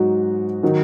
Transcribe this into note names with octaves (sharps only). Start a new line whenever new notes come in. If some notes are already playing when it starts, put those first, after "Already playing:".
Already playing: G#2 F#3 D#4 F#4
D#3 F#3 D#4